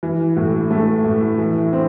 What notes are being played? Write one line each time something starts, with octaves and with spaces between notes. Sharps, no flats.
E3
A2
A3
A2
E3
C4